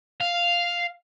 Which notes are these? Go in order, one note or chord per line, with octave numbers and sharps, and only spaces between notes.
F5